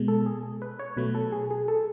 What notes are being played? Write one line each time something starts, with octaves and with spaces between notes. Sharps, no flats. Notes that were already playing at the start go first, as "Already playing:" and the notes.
Already playing: B2 G#3
A4
G#4
B4
C#5
B2 F#3 A3 B4
A4
G#4
G#4
A4